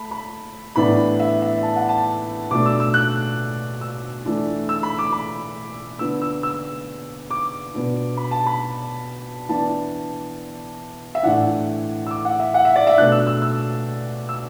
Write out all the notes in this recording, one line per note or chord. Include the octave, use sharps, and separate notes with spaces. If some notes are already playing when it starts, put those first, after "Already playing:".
Already playing: A3 A5 B5
B5
A2 E3 B3 D4 B5
E5
E5
A5
F#5
A5
B2 A3 D4 D6
E6
E6
F#6
E6
E3 A3 D4
E6
B5
D6
B5
D3 B3 D4 E6
E6
E6
D6
B2 B3 D4
B5
A5
B5
E3 B3 D4 A5
E5
A2 E3 D4 F#5
E6
D6
F#5
E5
F#5
E5
D5
E5
B2 A3 D4 F#6
E6
E6
E6
E6